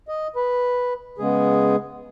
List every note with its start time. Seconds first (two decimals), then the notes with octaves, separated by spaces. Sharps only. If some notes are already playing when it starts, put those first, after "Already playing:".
0.08 D#5
0.36 B4
1.18 C#3 G#3 B3 G#4